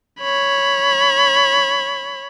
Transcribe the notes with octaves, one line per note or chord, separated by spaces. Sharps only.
C#5 B5